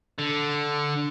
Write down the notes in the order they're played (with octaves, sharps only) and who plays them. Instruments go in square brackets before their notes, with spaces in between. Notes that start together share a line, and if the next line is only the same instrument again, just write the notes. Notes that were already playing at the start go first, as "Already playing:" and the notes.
[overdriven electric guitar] D3